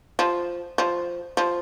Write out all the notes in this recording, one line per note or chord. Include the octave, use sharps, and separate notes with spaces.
F3
F3
F3